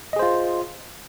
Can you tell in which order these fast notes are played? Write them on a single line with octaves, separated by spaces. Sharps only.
D#5 G#4 C5 F4